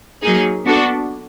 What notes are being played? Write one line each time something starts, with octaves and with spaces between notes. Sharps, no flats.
F#3 A#3 D#4 G#4
B3 D4 F#4 A4